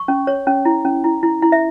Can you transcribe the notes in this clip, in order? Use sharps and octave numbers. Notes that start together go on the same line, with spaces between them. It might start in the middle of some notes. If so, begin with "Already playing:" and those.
Already playing: C#6
C#4
C#5
C#4
E4
C#4
E4
E4
E4
E5